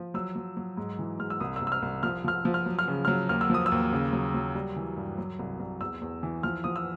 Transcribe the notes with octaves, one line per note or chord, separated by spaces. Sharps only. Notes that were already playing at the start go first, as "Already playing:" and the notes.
Already playing: F3
F#3 E6
F#3
F#3
G#2
E3
G#2 F6
E6
C2 D#6
E6
C2
E6
F6
C2
F3 F6
F3 F6
F3
F6
F#3
F6
C#3
F#3 F6
D#2 F6
E6
F3 D#6
E6
D#2
C#3
F#3
F#3
G3
E3
G2
F#3
C2
C2
E2 E6
E2
E3
F3 F6
F3 D#6
E6